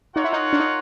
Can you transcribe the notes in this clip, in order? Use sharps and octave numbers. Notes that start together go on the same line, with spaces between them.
D#4 F4 A#4 C#5 F#5
E4
D#4
D4
D#4